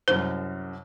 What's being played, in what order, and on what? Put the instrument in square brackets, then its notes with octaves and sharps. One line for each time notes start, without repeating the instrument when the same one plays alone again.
[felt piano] C2 F#2 [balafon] C5